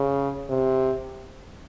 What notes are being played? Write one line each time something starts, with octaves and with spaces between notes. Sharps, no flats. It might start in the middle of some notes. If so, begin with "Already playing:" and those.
Already playing: C#3
C3